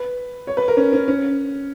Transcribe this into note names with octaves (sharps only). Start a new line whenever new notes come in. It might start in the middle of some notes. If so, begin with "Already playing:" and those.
Already playing: B4
C#5
B4
A#4
C#4
C#4
C#4